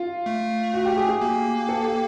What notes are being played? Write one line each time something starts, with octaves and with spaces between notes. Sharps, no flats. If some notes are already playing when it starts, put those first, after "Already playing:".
Already playing: F4
A3
F#4
G4
G#4
G#4
A#3
A4
G4